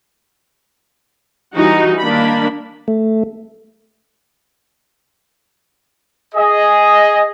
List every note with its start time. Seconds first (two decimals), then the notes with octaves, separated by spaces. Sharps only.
1.55 E3 G3 D#4 F#4
2.01 D#3 A#3 D4 B5
2.88 A3
6.35 G#4 D#5